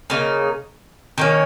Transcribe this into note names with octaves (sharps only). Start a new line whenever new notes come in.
C#3 A#3 D#4
D#3 A#3 C#4